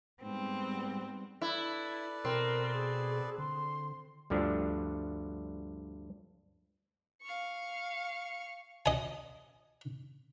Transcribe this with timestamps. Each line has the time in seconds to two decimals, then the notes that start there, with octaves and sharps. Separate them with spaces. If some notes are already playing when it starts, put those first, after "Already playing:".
0.23 G#2 G3 B3 C4
1.42 E4 A4 B4 D5
2.25 B2 C4 A#4
2.74 G#4
3.38 D3 C6
4.30 D2 G2 D3 F3 D4
7.22 F5 C#6
8.86 D#5 G#5